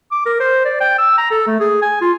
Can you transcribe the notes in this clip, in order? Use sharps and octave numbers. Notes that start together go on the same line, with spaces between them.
D6
A#4
C5
D5
G5
E6
A#5
A4
A3
G#4
G#5
F4